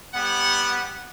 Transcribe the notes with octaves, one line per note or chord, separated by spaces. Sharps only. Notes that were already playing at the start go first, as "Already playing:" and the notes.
G3 B3 F#5